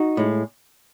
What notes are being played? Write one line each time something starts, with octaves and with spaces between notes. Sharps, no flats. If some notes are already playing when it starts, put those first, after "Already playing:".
Already playing: D#4 F#4
A2 G#3